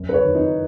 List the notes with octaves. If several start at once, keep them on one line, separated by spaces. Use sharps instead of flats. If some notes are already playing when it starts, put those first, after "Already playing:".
Already playing: F#2
B4
C#5
D#3
D#4